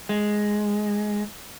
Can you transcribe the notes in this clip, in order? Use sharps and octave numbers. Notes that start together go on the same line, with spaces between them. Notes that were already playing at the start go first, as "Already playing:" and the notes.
G#3